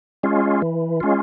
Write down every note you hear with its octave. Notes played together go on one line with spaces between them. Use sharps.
G#3 C#4 F4
E3
G#3 C#4 F4